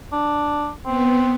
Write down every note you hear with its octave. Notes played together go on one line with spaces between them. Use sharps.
D4
B3 C4